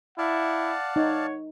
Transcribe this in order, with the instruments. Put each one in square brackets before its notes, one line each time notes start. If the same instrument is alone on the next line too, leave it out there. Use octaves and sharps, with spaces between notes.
[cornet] E4 [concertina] D5 F5 A5 [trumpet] F#5
[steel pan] D#4 [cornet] C#5